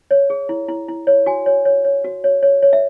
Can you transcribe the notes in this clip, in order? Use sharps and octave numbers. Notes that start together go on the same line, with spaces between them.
C#5
G#4
E4
E4
E4
C#5
F#4 G#5
C#5
C#5
C#5
F#4
C#5
C#5
C#5
E5